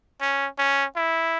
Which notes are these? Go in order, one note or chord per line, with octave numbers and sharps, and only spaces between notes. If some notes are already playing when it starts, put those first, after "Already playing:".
C#4
C#4
E4